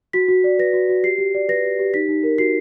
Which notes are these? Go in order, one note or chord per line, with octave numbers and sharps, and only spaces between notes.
F#4 B6
F#4
D5
B4 A#6
F#4
F#4
G4 C7
G4
D5
B4 A#6
G4
G4
D#4 B6
D#4
A#4
F#4 C7